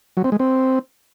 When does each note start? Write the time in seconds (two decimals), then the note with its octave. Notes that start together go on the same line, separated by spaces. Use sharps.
0.17 F#3
0.24 C4
0.32 G#3
0.40 C4